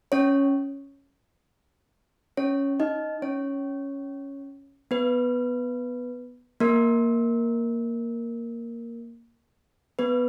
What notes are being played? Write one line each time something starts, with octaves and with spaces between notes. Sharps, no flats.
C#4 C#5
C#4 C#5
D#4 D#5
C#4 C#5
B3 B4
A#3 A#4
B3 B4